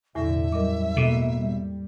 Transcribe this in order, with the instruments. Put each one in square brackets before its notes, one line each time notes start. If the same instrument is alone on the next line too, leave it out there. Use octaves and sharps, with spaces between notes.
[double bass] B1 D3 [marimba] E2 A2 A#6 [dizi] E5
[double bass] F#2 G3 [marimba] A#4 D#5 D6
[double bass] G#2 A#3 [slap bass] B2 [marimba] A4 D6
[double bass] G3